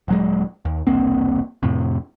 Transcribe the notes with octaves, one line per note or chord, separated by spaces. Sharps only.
D#1 F#3 G#3
D#2
E1 C2 A#3 C4
F2 A2 C3